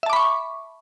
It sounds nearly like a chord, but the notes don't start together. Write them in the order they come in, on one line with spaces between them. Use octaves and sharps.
E5 A5 D6 B5 C#6